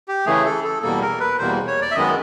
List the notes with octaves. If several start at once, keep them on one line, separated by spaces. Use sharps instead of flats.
G4
C#3 E3 A3 G#4
A4
A4
E2 B2 G3 A#3 A4
A#4
B4
E2 B2 G3 A#3 C5
C#5
D5
E5
F#2 D#3 G#3 B3 D#5